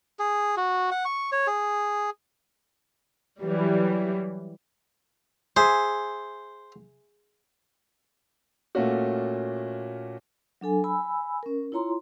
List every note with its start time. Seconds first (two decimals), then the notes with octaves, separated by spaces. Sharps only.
0.19 G#4
0.57 F#4
0.91 F#5
1.05 C#6
1.32 C#5
1.47 G#4
3.41 E3 F#3 G3
5.57 G#4 C5 E5
8.75 A#2 A3 A#3 C#4 F#4
10.61 F#3 D4 A4 G#5
10.84 G#5 B5 E6
11.43 C#4 A#4
11.72 E4 F4 C#5 A#5 C6